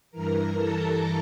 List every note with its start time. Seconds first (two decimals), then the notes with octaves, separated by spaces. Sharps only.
0.11 G2 E3 A#4 A#5
0.57 A4 A5